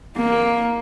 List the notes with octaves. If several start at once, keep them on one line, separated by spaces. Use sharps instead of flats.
A#3